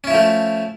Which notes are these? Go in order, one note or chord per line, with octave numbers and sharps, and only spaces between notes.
F3 A3 C#4 E4